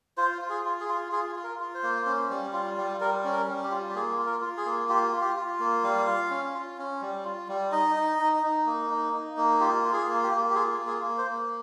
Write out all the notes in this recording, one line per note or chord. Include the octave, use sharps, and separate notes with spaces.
F4 C5
F4
G#4
F4
G#4
F4
F4 G#4
F4
A#4
F4
C5
A#3
C#4
G3
F4
G3
G3 A#4
C#4
A#4
G3
G4
F4
G4
A#3 G#4
F4
A#4
F4
G#4
A#3
F4 G4
F4
G4
F4
A#3
G3 F5
F4
C#4
F4
C#4
G3
F4
G3
D#4 D#5
D#4
D#4
D#4
A#3
D#4
D#4
A#3
F4 G4
F4
G#4
A#3
G4
A#3
G4
F4 G#4
A#3
G#4
A#3
C5
A#3